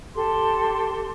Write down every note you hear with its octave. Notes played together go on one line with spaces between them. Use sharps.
G4 A4 C6